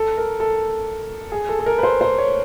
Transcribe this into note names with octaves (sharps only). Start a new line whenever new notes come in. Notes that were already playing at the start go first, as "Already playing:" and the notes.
Already playing: A4
A#4
A4
G#4
A4
A4
A#4
B4
C5
C5
C#5